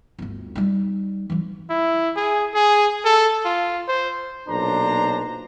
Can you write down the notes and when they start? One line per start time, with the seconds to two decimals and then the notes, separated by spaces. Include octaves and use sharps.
0.18 G1 D2
0.55 G3 D#4
1.30 E3 F#3
1.70 E4
2.16 G#4
2.55 G#4
3.05 A4
3.45 F4
3.88 C5
4.49 B1 A#2 D4 C5 A#5